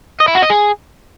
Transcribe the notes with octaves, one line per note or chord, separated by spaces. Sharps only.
D#5
E4
F#4
D#5
G#4